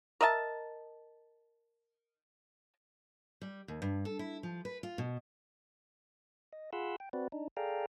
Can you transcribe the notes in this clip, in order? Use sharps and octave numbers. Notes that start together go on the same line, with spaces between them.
A#4 D#5 E5 A5
G3
D#2
G2
A4
E4
F3
B4
F4
B2
D#5
F4 G#4 F#5 B5 C6 E6
G5
C4 F#4 B4 D5
D4 D#4
G#4 A4 D5 F5 G5 A#5